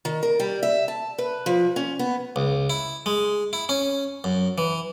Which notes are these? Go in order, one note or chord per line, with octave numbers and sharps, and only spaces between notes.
D#3
A#4
G3
E5
A5
B4
F3
C#4
B3
C#2
E4
G#3
E4
C#4
F#2
E3